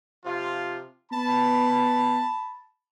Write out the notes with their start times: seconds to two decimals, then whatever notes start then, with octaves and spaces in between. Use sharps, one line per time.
0.25 C3 F3 F4
1.12 B3 A5 B5